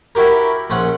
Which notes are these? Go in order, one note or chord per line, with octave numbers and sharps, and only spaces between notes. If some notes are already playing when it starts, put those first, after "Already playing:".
E4 F#4 G4 A#4
A#1 C#4 C5 F#5